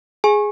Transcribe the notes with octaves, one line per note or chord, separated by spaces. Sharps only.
G#4 G#5